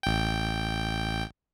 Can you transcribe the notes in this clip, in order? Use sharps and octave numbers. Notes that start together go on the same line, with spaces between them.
A1 G5